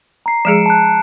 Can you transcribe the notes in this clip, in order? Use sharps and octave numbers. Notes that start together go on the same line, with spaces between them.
A#5 C7
F3 G#3 G#4 C#7 D7 E7
A5 F#6